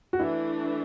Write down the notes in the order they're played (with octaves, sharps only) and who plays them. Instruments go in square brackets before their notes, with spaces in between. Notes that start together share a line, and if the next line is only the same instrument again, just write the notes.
[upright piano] F#4
[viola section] E3 A3 D4 [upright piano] E4